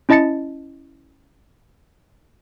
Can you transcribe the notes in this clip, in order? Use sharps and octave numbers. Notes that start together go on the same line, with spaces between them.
C#4 E4 D#5 A5 A6 C#7